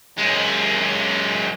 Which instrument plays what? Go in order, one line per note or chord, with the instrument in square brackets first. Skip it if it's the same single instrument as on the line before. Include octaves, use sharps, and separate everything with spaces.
[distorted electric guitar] F#2 G#3